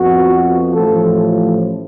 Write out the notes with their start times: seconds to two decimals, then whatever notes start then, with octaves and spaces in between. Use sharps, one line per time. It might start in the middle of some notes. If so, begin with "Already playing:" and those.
Already playing: F2 F3 B3 F#4
0.75 A1 A2 F3 A4